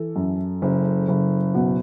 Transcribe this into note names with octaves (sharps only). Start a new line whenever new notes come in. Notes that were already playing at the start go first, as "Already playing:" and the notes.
Already playing: E3 A4
F#2
F#1
F#1
B2 F#4